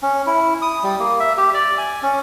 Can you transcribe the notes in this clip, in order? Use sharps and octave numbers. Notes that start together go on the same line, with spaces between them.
C#4
E4
D#6
G3
A#3
E5
G4
D5
G#5
C#4